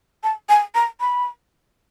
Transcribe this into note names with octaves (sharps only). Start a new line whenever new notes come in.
A5
G#5
A#5
B5